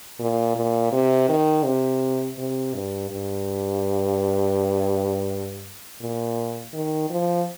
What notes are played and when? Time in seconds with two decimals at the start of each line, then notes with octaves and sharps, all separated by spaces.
0.20 A#2
0.56 A#2
0.92 C3
1.29 D#3
1.65 C3
2.38 C3
2.74 G2
3.10 G2
6.01 A#2
6.74 D#3
7.10 F3